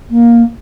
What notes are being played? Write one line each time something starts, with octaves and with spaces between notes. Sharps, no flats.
A#3